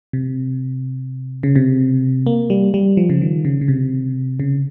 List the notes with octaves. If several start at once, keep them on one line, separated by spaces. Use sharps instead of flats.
C3
C#3
C3
A#3
G3
G3
F3
C#3
D#3
C#3
C#3
C3
C#3